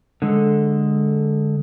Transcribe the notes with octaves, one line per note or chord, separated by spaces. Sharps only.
D3 G#3 A4